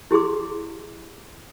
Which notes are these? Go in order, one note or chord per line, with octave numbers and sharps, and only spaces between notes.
E4 G4 G#4 C6 D6